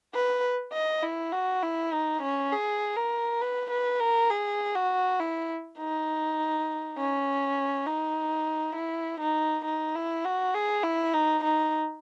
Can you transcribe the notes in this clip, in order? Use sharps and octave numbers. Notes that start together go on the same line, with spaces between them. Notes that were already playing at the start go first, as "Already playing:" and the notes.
B4
D#5
E4
F#4
E4
D#4
C#4
G#4
A#4
B4
B4
A#4
G#4
F#4
E4
D#4
C#4
D#4
E4
D#4
D#4
E4
F#4
G#4
E4
D#4
D#4